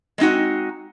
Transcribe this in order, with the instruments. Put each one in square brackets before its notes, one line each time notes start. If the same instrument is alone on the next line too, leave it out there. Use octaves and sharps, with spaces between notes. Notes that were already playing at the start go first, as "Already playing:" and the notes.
[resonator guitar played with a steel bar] G#3 C4 D#4 F#4